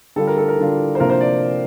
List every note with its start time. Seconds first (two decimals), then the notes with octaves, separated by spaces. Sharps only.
0.16 D3 G3 D4 F4 A4
0.27 A#4
0.37 A4
0.48 A#4
0.58 D3 G3 D4 F4
0.95 C5
1.00 C3 F3 A#3 D4 F4 A#4
1.10 C5
1.21 D5